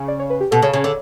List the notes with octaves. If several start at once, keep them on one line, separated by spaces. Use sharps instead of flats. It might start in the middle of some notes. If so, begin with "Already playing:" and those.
Already playing: C#3
D5
C#5
B4
G4
B2 A4
C#3 C#5
C#3 C#5
D3 C#5